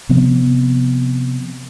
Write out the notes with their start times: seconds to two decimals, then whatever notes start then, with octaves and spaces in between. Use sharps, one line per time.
0.09 C3 F3 B3 C4